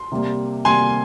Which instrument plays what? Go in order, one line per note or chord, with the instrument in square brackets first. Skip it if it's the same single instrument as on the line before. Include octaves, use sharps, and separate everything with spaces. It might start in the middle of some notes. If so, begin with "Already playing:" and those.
Already playing: [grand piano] C6
[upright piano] C3 G3 A#3
[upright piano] C3 G3 A#3 [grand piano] G#5 C6